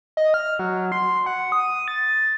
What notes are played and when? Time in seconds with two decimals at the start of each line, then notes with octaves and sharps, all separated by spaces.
0.17 D#5
0.34 F6
0.59 F#3
0.92 C6
1.26 F#5
1.52 D#6
1.88 A6